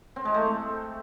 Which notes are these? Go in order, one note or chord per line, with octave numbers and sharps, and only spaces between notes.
C4
G#3
A3